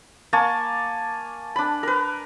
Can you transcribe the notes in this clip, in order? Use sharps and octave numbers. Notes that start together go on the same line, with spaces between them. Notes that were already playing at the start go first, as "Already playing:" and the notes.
A#3 G#5 A5 C#6
D4 B5
A#4 B4